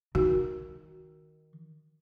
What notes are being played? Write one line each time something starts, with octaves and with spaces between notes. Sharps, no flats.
D#3 F#4